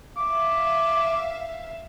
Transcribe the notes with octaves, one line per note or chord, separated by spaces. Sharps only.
E5 F5 D6